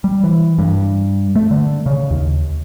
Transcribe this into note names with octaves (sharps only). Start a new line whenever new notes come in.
G3
E3
G2
A3
D3
C#3
D#2